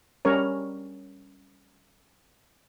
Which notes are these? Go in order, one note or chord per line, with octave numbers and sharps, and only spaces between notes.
G3 C#4 A#4 C#5